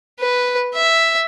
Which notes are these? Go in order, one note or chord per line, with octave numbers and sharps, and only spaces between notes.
B4
E5